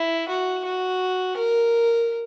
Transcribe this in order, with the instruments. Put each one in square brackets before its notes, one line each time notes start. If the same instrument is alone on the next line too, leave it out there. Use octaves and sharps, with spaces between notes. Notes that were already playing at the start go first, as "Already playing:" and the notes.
Already playing: [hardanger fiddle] E4
F#4
F#4
A#4